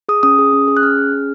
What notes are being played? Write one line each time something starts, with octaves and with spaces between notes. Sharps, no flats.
G#4 D#6
C#4 D#6
G#4
C#4
G#4
F#6
C#4 F6
G#4
C#4